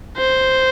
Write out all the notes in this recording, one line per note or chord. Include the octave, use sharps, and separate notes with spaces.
C5